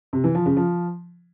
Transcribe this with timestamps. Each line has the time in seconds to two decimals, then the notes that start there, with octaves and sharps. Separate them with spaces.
0.13 C3
0.24 E3
0.35 F3
0.46 C#3
0.57 F3